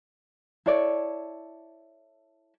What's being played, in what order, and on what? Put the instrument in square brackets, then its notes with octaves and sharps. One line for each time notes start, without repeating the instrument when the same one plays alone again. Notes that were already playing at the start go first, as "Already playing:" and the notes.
[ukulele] E4 A4 C#5 D5